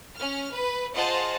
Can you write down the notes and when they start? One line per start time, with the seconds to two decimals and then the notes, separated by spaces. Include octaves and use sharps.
0.16 C#4 F6
0.53 B4
0.95 F4 G#4 C5 D#5 F#5 A5